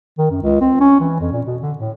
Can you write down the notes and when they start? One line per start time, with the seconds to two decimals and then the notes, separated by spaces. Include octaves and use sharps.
0.18 D#3
0.31 F#2
0.42 C#2
0.61 C4
0.80 C#4
1.00 E3
1.20 F2
1.32 A#2
1.46 B2
1.62 D3
1.78 A2